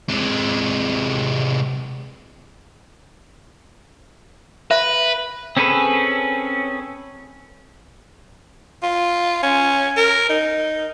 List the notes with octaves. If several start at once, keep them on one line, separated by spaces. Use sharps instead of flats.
C3 G#3
B4 E5
C4 C#4 G#4 A4 B4
F4
C#4
A#4
D#4